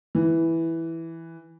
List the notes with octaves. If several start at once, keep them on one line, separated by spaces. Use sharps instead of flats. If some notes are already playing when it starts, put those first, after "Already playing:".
E3